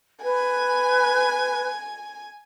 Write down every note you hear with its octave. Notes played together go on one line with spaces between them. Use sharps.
B4 G#5